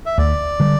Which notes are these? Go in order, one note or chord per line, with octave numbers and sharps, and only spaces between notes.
E5
D2 D5
D3 G3